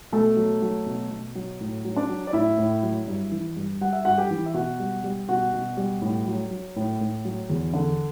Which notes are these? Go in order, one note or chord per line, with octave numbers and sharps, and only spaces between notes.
B2 A3 A4
F#3
F#3
B2
B2
F#3
A2
F#3
D4 D5
F#3
D5
A2 E4 E5
A2
F#3
G2
E3
G2
G3 F#5
E5
G2 F#4 F#5
G4 G5
E3
E5
B2 F#4 F#5
G3
G3
B2 F#4 F#5
B2
G3
A2
F#3
F#3
A2
A2
F#3
E2
D3